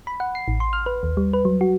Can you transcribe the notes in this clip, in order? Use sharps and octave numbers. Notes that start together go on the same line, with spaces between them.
B5
F#5
C7
A1
C6
F6
B4
D#2
G3
B4
F#3
F#4